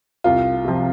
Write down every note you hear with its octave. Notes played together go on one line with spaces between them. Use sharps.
C2 F4
C3 F3